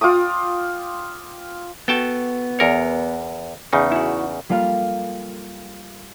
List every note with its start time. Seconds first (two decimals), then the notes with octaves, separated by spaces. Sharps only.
0.01 F4 G5 D6 D#6
1.88 B3 F#4 A4 G5 A5
2.59 E2 A#4 C#5
3.73 E2 C#3 D#4
3.92 E4 F#4
4.49 G3 A#3 F4 A4 F5